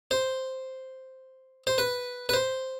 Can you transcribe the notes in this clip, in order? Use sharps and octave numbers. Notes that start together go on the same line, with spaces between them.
C5
C5
B4
B4
C5